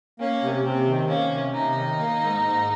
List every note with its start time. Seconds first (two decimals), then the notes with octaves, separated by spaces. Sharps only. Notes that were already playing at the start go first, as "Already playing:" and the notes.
0.19 A#3 C#4
0.42 C3
0.64 C3 C4
0.87 D#3
1.08 A#3 C#4
1.31 C3
1.53 C3 D#4
1.75 D#3
1.98 A#3
2.20 G#2
2.43 G#2